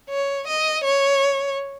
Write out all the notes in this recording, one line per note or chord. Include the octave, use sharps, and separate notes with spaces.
C#5
D#5
C#5